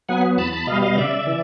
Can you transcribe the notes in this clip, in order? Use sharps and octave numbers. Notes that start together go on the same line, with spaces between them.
F#3 B3 F#5 G#5
E2 A5 B5
A5 B5
B2 G3 D#5 F5
D#5 F5
C#3 D5 E5
E3